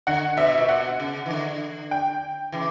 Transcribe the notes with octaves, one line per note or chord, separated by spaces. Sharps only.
D3 F#5
B2 E5
A#2
B2 F#5
C#3
E3
D3
G5
C#3 E3